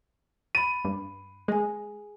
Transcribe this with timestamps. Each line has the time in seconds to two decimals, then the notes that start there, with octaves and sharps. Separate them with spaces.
0.55 B5 A6 D#7
0.85 G2
1.48 G#3 G#4 G#5